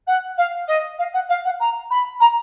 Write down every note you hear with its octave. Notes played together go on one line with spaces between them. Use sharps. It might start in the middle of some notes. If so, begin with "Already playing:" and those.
F#5
F5
D#5
F5
F#5
F5
F#5
A#5
B5
A#5